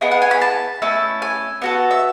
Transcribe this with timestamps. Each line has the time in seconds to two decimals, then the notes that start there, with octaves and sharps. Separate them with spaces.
0.01 B3 E4 G#4 D#5
0.11 F#5
0.22 G#5
0.31 B5
0.42 A5
0.82 A3 C#4 E4 A4
1.22 G#5
1.62 B3 F#4 A4
1.91 E5